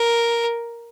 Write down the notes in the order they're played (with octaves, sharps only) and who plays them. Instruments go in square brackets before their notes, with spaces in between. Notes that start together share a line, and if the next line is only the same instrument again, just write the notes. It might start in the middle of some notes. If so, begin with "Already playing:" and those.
Already playing: [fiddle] A#4